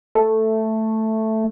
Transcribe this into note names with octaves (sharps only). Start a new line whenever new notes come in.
A3